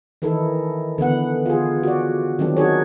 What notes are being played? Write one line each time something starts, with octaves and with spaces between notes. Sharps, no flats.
D#3 E3 D#4 E4 A4
D3 E3 B3 F#5
F4 G#4
F#4 D5
D#3 F#3 C4 D4
D#4 F#4 G#4 C#5